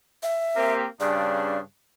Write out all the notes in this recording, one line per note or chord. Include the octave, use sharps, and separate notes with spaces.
E5
A#3 C4 G4
G2 C#3 D4 D5